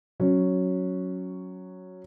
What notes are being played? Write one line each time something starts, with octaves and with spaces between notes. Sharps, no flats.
F#3 C#4